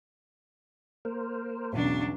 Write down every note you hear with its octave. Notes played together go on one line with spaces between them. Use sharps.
A#3 A#4 C5
B1 E2 C#3 F#3 D4